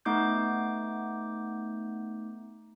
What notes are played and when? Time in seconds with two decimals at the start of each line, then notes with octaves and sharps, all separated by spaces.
0.05 A3 B3 D#4 D6 G6